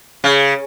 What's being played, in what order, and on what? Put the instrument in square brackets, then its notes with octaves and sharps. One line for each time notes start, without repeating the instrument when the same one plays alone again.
[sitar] C#3